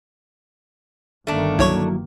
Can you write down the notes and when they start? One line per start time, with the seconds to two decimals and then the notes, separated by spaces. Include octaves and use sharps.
1.27 G1 D#3 A3 A#3 D4
1.59 C2 F#3 E4 C#5 C#6